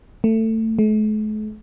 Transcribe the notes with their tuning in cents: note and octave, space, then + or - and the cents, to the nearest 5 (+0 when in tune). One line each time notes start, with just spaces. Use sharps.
A3 +20
A3 -45